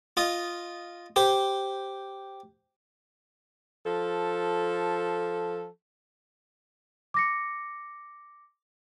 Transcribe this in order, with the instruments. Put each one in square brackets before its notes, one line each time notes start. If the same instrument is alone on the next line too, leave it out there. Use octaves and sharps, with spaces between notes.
[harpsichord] F4 D#5
G4 C5
[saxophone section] F3 A4
[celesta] D6 A#6 C#7